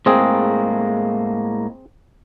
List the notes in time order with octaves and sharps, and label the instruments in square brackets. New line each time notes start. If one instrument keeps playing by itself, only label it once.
[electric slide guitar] A2 G#3 A#3 [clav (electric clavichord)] C4 G#4